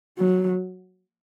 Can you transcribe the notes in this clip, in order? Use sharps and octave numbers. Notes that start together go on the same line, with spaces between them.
F#3